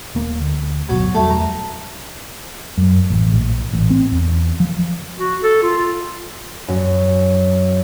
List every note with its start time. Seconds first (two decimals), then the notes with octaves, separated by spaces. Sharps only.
0.15 D#1 A#3
0.40 D2
0.89 D1 G1 B2 F#3
1.14 E2 F#3 G3 A3
1.30 A#5
2.78 F#2
3.10 A1
3.32 A#1
3.73 A1
3.90 C4
4.12 E2
4.60 F3
5.19 F#4
5.43 A4
5.63 F4
6.68 F#2